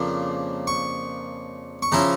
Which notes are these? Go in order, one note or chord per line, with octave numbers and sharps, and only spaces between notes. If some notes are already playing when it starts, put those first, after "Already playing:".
Already playing: F2 C#3 F3 A#3 D4
C#6
C#6
C#3 F3 C#4 E4 A#5